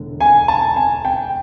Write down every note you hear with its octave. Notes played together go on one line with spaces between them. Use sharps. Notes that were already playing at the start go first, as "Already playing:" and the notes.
Already playing: E1 D3
G#5
A5
G#5
G5